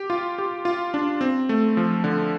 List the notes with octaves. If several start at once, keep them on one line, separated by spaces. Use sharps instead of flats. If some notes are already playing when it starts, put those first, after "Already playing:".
Already playing: G4
F4
G4
F4
D4
C4
A3
F3
D3